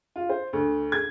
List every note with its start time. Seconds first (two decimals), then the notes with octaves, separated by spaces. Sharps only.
0.16 F4
0.30 C5
0.53 D2
0.92 G#6